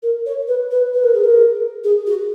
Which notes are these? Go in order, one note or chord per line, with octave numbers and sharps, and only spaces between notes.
A#4
C#5
B4
B4
B4
A#4
G#4
A#4
G#4
F#4